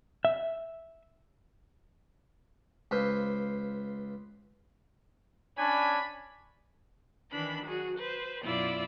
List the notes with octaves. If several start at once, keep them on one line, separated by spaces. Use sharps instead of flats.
E5
C#2 B4 C5 F5 C6
C#4 D4 C#5 G#5 B5
D#3 E3 D4 B5
F#3 F#4 G#4
B4 C5
F#2 B2 E4 F4 D5 E6